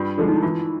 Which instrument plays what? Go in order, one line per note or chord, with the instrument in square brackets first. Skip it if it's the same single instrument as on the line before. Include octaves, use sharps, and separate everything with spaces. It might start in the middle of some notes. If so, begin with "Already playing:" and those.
Already playing: [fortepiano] G2 [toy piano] F4
[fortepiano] D3 F3 G#3
[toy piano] D#4
E4
[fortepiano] E3 [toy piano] F4